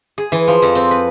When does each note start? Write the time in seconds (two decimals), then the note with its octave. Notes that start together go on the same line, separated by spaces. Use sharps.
0.18 G#4
0.32 E3
0.48 F3
0.62 F2
0.75 C4
0.91 B4